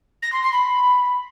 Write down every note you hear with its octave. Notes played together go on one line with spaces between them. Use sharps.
A#6
C6
C6
B5